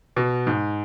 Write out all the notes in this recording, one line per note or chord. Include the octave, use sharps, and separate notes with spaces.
B2
G#2